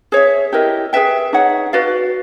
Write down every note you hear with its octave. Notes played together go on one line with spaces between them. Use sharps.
G#4 C#5 E5
E4 G4 A#4 D#5
G#4 B4 E5 G5
D#4 G#4 C#5 F#5
F#4 B4 D5 F5